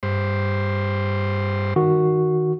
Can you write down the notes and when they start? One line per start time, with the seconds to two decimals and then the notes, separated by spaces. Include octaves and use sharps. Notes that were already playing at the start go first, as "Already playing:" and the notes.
0.03 G2 C5
1.76 D#3 F#4